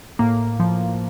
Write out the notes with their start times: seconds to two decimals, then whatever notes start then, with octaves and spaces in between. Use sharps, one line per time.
0.19 A2 A#3
0.60 F3